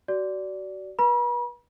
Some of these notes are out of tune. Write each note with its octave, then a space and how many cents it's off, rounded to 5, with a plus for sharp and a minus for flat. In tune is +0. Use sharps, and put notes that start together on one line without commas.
F#4 +30 D5 -15
B4 -35 B5 -45